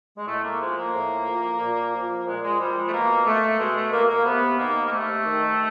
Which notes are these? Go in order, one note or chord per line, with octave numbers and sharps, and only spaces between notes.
G#3
A2 A3
A#3
F3 G#3
A#3
A2
F3
A#2
F3
A#2 G#3
G#3
F3 G3
G#3
A3
B2 A#3
A3
B2 G#3
A3
A#3
A#3
C3 B3
D#3 A#3
A#3
C3 A3
D#3